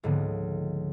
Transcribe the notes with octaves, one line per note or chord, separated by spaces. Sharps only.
C#2 G#2 D3 F3 A#3 B3